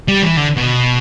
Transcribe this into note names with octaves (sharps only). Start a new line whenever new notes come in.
G3
E3
D3
B2